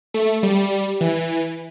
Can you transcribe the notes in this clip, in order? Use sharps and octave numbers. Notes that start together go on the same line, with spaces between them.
A3
G3
E3